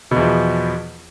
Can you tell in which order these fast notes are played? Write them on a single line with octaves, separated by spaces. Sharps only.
B2 E2 F3